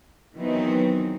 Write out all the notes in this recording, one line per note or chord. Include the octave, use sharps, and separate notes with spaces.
D#3 E3 F#3 B3 C4 D#4